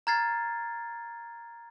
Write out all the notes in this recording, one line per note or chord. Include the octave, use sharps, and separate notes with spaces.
A#5 F6 G#6 A6 C7